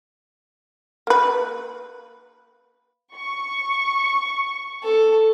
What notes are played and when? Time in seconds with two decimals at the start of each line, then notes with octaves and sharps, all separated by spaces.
1.07 A#3 B4
3.15 C#6
4.83 A4